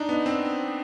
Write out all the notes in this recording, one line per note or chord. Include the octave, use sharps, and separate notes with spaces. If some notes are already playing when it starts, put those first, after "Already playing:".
Already playing: D4 D#4
B3
C4